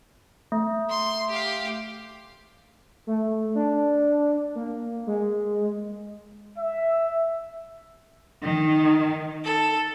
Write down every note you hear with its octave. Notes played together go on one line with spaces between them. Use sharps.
A3
C6
G4 F5
A3
D4
A#3
G#3
E5
D#3
A4